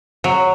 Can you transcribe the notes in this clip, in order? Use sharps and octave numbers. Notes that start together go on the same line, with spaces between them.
F#3